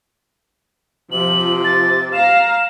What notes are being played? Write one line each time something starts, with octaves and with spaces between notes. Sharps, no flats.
C3 F3 F#7
A6
F5 A#5 E7